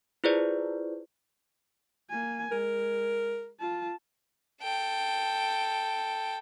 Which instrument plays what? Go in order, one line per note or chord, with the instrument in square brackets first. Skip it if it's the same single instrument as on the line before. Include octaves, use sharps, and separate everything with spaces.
[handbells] E4 F4 G#4 B4 C5 D5
[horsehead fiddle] A#3 G#5
[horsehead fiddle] G#3 [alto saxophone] A#4
[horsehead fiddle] F4 A5
[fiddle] A4 G5